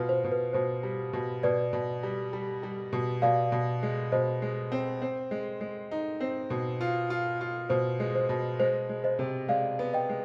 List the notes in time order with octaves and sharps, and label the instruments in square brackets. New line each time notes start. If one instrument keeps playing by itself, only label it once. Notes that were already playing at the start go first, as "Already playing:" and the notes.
Already playing: [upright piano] B2 F4 [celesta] B4
[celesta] C5
[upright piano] B2
[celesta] B4
[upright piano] B2 [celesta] C5
[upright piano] G3
B2
[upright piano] B2 [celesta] B4 D5
[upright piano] B2
G3
G3
G3
B2
[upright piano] B2 [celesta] D5 F5
[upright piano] B2
G#3
[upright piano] B2 [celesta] C5 D#5
[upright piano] G#3
C4
C4
G#3
G#3
D#4
C4
B2
F4
F4
F4
[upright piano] B2 [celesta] C5
[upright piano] G#3
[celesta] C5
[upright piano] B2
[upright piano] G#3 [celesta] C5
[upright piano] G#3
[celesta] C5 D#5
[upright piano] C3
[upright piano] G#3 [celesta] D5 F5
[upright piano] B3
[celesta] D#5 G5
[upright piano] G#3